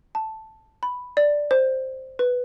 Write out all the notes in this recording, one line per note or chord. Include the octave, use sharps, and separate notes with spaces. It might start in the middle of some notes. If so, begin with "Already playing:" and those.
A5
B5
D5
C5
B4